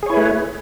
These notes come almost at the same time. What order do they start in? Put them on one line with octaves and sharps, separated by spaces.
G#4 C#5 E4 B4 A3